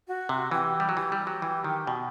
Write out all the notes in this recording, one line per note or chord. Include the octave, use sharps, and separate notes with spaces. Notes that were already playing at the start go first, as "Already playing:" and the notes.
F#4
C3
E3 G4
G3
F#3
E3 G4
G3
F#3
E3
D#3
B2